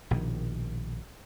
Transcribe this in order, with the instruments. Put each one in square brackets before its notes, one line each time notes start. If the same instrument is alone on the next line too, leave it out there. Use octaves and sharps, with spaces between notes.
[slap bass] A#1 B2 D3 D#3